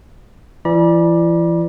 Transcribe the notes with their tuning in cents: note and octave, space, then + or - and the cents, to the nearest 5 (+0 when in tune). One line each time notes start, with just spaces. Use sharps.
E3 +35 D5 +10 B5 -45